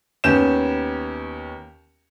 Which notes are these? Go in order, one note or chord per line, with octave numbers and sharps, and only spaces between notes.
D#2 B3 C#4 G6 E7